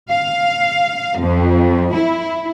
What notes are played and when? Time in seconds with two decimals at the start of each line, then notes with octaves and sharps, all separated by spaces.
0.10 F5
1.20 F2
1.93 E4